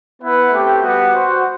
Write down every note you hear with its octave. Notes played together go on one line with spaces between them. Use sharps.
B3 E4 B4 F#5
A3 C4 G4
G3 B3 F#4 B4 F#5
F#4 C5 F#5